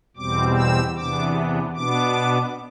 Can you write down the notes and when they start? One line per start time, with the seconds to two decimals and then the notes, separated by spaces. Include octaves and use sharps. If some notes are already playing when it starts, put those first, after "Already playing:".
0.16 E2 B2 G3 C4 D6
0.56 E6
0.96 E2 C3 E3 B3 D4 D6
1.74 B2 B3 D4 D6